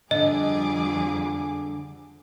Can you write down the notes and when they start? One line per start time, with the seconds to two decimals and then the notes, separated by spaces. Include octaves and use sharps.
0.11 F2 D3 G3 G#4 D#5 D6